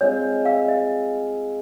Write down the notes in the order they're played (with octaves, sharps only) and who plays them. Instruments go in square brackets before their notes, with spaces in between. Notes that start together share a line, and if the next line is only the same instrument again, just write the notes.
[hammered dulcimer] G#3 C4 F4 [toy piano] C#5
[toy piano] F5
D#5